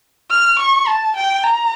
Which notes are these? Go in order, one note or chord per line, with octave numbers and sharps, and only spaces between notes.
F6
C#6
A5
G5
A#5